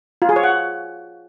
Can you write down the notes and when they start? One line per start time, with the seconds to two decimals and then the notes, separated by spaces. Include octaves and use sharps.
0.22 F4
0.29 G#4
0.36 C#5
0.43 F#5